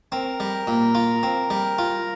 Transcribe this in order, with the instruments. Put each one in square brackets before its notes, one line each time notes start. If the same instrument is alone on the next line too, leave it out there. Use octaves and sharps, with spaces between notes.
[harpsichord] C4 [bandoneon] A#4 A#5
[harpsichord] G3
A#2
F4
C4
G3
F4